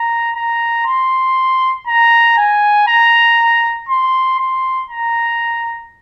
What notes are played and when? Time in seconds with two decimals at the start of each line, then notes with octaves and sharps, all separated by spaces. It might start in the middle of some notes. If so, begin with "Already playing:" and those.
Already playing: A#5
0.35 A#5
0.85 C6
1.87 A#5
2.37 G#5
2.87 A#5
3.89 C6
4.39 C6
4.90 A#5